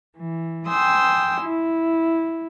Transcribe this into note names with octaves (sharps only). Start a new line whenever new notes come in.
E3
G5 G#5 C6 D#6 E6
E4